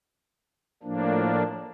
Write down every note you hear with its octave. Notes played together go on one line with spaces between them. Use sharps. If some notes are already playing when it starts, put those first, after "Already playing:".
A2 F3 A#3 D4